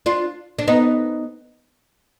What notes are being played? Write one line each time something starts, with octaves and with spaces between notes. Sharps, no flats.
D4 F4
D4
B3 D#4